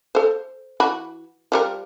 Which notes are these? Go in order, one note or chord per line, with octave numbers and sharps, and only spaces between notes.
A4 C5
E3 F#4 B5
F3 G3 A#4